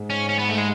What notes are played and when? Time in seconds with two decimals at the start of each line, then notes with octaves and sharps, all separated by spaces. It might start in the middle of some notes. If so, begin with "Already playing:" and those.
Already playing: G#2
0.10 C#4
0.29 C#4
0.39 B3
0.49 A3
0.57 G#3